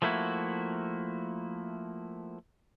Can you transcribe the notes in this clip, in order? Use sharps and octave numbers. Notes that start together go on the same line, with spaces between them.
F3 A3 A#3 E4 F#4